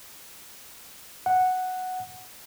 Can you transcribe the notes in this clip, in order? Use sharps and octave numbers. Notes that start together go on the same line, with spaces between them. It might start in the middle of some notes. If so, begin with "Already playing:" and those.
F#5